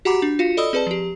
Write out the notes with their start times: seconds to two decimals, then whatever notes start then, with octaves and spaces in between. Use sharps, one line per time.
0.05 F#4 G4 F#5 A#5 B5 D6
0.22 D4
0.39 F4 F#4 F5 C#7
0.57 A4 D5 D#5 B5 D#6 E6
0.73 C4 G#4 B4 D5 A5
0.87 F3 G4